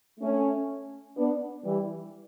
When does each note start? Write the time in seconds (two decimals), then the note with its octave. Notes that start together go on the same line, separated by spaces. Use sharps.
0.20 A3 C#4
1.16 B3 D4
1.64 E3 G3